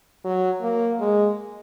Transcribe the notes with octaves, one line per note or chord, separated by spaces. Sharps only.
F#3
A#3
G#3